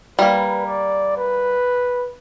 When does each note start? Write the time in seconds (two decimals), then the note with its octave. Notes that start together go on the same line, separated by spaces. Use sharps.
0.19 G3 A#3 B4
0.66 D5
1.16 B4